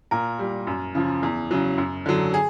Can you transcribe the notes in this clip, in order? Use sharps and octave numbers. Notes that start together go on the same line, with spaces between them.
A#2 A#4
G3
F#2
C#3 F3
E2
C#3 F#3
F#2
D3 F#3
G#4